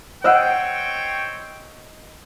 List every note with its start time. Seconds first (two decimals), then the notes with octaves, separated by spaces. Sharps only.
0.24 C4 C5 C#5 D#5 F#5 G5 E6 F#6